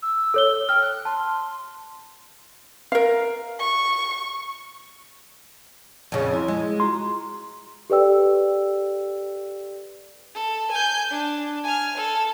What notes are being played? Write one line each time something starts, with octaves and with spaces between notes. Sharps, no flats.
E6
A4 C#5 G7
G5 F6
F#6
A5 C6
A#4 F5
C#6
F2 C#3
E4 C6
G#3
F4 F#4 A#5 C6
G4 A4 B4 D5 G5 E6
A4
G#5 G6
D4
G#5 F6
A4